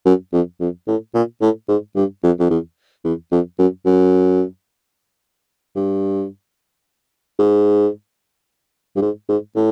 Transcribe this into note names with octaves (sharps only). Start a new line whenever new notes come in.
F#2
F2
F2
A2
A#2
A2
G#2
G2
F2
F2
E2
E2
F2
F#2
F#2
G2
G#2
G2
G#2
G#2
A2